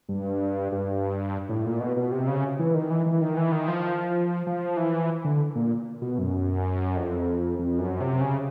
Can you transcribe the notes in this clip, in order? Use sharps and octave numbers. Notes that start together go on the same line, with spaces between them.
G2
G2
A2
A#2
B2
B2
C3
C#3
E3
D#3
E3
E3
D#3
E3
D#3
F3
F3
E3
D3
A#2
B2
F#2
F2
F2
F#2
C3
C#3